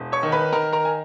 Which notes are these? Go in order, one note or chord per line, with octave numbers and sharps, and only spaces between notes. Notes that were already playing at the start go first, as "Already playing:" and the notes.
Already playing: E1
C#5 C#6
D#3
B4 B5
D#3 A#4 A#5
A#4 A#5
G#5